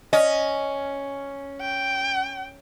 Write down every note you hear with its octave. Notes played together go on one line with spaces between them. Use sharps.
C#4 D#5
G5